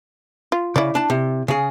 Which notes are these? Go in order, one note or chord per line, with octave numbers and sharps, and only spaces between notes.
F4
C#3 E4 D5
D4 A5
C3
C#3 G#4